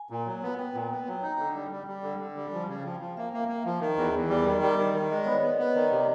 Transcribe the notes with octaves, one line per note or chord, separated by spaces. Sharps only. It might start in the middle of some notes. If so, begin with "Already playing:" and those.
Already playing: G#5
A#2
F#3
B3
B3 G5
A#2
B3
F#3
D#4
D3
G3
G3
G3
D3
D3
G3
F3 G#5
C#3
G5
F3
F5
F3
A#3 E5
A#3
A#3
F3
D#3
E2
E2
G3
D#3 D#5
G3
D#3
D#3
G#3 D#5
D5
B3 C#5
D5
B3
B3
D#5
D#3 D5
C3